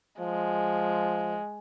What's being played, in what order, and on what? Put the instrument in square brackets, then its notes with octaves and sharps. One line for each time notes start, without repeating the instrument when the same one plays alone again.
[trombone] F3 [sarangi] G#3